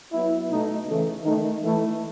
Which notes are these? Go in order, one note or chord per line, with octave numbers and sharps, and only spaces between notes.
F#3 B3 E4
B2 A3 D#4
C#3 E3 A3
D#3 A3 D#4
E3 A3 E4